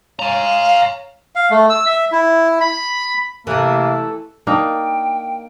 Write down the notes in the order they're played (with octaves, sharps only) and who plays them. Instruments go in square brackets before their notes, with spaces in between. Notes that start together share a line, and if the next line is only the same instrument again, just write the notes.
[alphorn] C#5 [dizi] F5 [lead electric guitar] G#5 A#5
[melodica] F5
A3
E6
E5
E4
B5
[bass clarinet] C3 [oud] E3 A3 [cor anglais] A#3 [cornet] A4
[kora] A#3 D4 D#4 [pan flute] G5